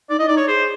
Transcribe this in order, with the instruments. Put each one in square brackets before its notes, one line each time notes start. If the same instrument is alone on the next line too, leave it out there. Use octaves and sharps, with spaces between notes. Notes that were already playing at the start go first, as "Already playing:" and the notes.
[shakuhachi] D#4 [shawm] D5
[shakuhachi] E4 [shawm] D#5
[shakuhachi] D#4 [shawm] D5
[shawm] C#5
[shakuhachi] G#4 [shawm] C5